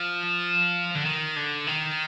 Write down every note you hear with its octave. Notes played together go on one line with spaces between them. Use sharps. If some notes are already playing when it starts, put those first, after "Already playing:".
Already playing: F3
D3
D#3
D3
D#3